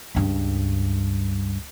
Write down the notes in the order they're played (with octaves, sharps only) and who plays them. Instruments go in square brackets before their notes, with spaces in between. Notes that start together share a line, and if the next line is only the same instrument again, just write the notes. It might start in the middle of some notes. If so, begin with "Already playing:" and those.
[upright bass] C#2 G2